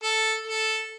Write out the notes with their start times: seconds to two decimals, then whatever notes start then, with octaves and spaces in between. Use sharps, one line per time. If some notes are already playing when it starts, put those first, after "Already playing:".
0.04 A4
0.47 A4